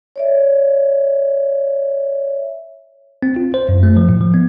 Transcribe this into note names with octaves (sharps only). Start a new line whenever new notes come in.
C#5 D5 E5
C4
F4
C5
F#2
A3
F3
A2
F3
B3